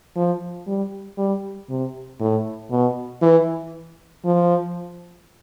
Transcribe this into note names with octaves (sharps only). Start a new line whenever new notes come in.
F3
G3
G3
C3
A2
B2
E3
F3